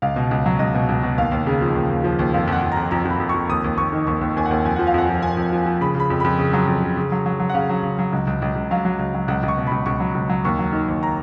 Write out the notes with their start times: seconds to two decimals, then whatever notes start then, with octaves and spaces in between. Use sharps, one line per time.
0.02 C#2 F5
0.16 B2
0.31 C#2
0.46 F#3
0.59 C#2 D#5
0.74 B2
0.89 C#2
1.03 B2
1.18 D#2 F5
1.32 D#2
1.47 C#3
1.62 F3
1.76 D#2
1.90 D#2
2.04 F3
2.19 D#2
2.34 F2 F5
2.47 F2
2.52 F#5
2.62 F2
2.72 A#5
2.77 F2
2.91 F2 A#5
3.05 F2
3.10 B5
3.20 F2
3.29 C#6
3.34 F2
3.49 D#2 D#6
3.64 D#2
3.78 D#2 C#6
3.92 D#3
4.07 D#2 C#6
4.21 D#2
4.36 D#2 G#5
4.46 F#5
4.51 D#2
4.65 F2 G#5
4.76 F3 F#5
4.87 F5
4.94 F2 F#5
5.09 F3
5.22 F2 G#5
5.37 F2
5.53 F3
5.66 F3
5.81 C#3 B5
5.95 C#3 B5
6.10 F2
6.20 F2 B5
6.39 C#3
6.53 F#3
6.67 F2
6.82 C#3
6.97 C#3
7.12 F#3
7.26 F#3
7.40 F#3
7.49 F#5
7.54 C#3 F5
7.69 F#3
7.83 C#3
7.99 F#3
8.13 C#2
8.27 C#2
8.42 C#2
8.55 C#2
8.71 F#3 F5
8.85 F#3
8.99 C#2
9.14 F#3
9.28 C#2 F#5
9.43 C#2
9.48 C#6
9.57 B2
9.67 B5
9.71 C#2
9.86 C#2 C#6
10.00 F#3
10.15 C#2
10.29 F#3
10.45 D#2 C#6
10.59 F#3
10.73 D#3
10.88 D#2
11.03 A#5